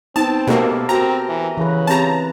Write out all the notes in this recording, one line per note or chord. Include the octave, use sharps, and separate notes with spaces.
B3 C4 D#4 A5
B2 A#3 G4 A4 A#4
C4 F#4 A#5
E3
C#3 E3 B4
C4 G4 A5 A#5